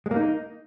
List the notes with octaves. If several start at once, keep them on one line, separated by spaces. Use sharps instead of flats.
G#3
A#3
D#4